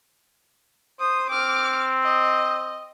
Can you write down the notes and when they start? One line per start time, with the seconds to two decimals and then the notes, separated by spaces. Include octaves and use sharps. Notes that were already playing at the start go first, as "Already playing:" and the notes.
1.00 C5 D#6
1.30 C4 D6 F6
2.03 D#5